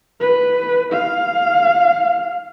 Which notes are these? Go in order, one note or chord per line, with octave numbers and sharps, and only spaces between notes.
B4
F5